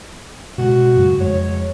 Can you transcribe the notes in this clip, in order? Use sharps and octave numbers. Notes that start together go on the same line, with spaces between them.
B2 G#3 F#4
F#2 C#3 G#3
F2 G#3 C#5